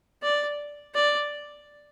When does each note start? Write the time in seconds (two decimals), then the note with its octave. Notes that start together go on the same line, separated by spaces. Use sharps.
0.23 D5
0.95 D5